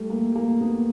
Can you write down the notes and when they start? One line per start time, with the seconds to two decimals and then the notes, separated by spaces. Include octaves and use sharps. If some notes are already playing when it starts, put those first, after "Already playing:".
Already playing: G3 A3
0.10 A#3
0.36 A#3
0.61 B3